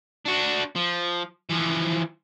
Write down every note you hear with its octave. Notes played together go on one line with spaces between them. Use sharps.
D4 F#4
F3
E3 F3